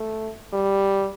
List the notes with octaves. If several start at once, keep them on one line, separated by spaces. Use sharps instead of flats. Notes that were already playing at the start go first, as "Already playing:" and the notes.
Already playing: A3
G3